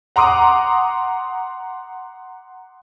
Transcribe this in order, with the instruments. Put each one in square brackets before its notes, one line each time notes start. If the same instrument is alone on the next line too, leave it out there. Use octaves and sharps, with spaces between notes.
[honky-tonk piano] F#5 A#5 C6 D6 D#6